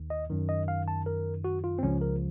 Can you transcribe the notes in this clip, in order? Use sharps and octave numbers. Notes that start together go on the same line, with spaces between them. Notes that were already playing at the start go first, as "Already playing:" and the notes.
Already playing: D#2 D#3
D#5
F#2 D#3
D#5
F5
A5
A#4
F#4
F4
C4
C#2 C#3 F3 C#4
A#4